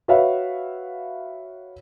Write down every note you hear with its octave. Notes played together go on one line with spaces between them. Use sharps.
F#4 B4 C#5 E5 F5